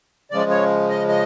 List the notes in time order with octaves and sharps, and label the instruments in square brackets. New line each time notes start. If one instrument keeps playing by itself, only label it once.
[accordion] C#3 F3 G#3 D5
C#5
D#5
D#5